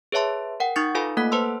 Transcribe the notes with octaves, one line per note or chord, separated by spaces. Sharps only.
G#4 B4 C#5 E5 A5 C6
A#4 F#5 G5
D#4 C#6 D#6 G6 A6 C#7
F4 A4 B4 F5 G#5 B5
A3 A#3 A4 F#5 F#6 B6
B4 C5 A5 C6 E6